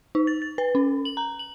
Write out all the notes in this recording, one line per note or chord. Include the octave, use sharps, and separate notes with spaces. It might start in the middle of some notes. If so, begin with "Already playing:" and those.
D#4
A6
A6
B4
C#4
F#7
A#5
F#7